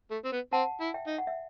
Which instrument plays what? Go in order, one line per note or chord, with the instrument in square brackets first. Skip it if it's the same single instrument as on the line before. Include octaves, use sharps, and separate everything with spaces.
[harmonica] A3
C4
B3
[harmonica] C4 [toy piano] F#5 A5
[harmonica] E4
[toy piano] E5 G5
[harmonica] D#4
[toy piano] F#5
E5